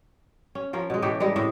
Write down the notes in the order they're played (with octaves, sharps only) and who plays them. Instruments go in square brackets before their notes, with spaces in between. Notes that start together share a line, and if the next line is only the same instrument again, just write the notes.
[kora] C#4
F3 C#4 A#4
B2 G#3
A2 E3 A3 G4
G3 G#3 E4 B4
A2 C3 D#5 E5